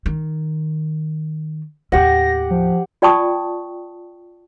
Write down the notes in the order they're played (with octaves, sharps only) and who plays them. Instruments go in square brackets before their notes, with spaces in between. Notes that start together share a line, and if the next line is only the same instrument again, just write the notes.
[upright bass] D#3
[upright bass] D#2 A2 [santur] G4 F#5 [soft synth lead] A#6
[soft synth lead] F3
[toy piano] F4 D5 G5 A5 C#6 D#6